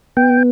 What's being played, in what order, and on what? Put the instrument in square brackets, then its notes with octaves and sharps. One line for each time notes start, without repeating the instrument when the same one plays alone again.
[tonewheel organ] B3 G5